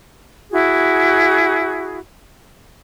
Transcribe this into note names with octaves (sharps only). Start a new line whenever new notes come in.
E4 F#4 G#4